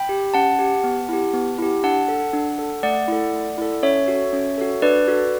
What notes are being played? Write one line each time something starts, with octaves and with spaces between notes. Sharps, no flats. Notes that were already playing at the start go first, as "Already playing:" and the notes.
Already playing: G5 B5
G4
C#4 F#5 A5
G4
B3
E4 G4
B3
E4 G4
D4 F#5 A5
A4
D4
A4
A3 D5 F#5
E4 A4
A3
E4 A4
C#4 C#5 E5
F#4 A4
C#4
F#4 A4
D4 B4 D5
F#4 A4